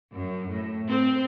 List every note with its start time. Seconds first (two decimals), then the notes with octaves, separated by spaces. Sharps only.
0.13 F#2
0.50 A2
0.89 C4